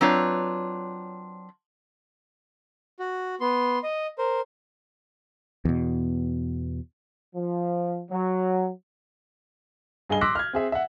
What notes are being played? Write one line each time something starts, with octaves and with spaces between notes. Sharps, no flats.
F#3 C4 D4 F4 B4 C#5
F#4
B3 C6
D#5
A#4 C5
E2 B2
F3
F#3
G2 G#4 D#5 G#5 G7
C6 D6 E6 F#6 A#6 B6
F6 G#6
C4 G#4 E5
E5 F#5